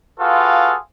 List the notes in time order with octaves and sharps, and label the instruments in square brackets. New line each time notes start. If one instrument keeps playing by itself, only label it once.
[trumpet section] F4 F#4 G#4 A4 B4 F5